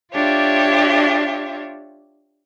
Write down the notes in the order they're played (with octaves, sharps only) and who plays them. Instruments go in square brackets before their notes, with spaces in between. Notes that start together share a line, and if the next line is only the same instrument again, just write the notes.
[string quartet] D4 F4 G4 C#5 E5